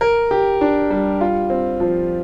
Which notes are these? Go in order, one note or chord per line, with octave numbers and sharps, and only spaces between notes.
A#4
G4
D4
G3
F4
C4
F3